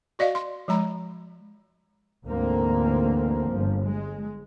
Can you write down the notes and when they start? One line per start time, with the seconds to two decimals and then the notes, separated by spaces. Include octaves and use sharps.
0.19 F#4 D5 D#5 F5
0.35 C6
0.68 F3 G#3 A#5 B5
2.24 D2 G#2 E3 A#3 C4
3.47 G1 F3
3.83 G#3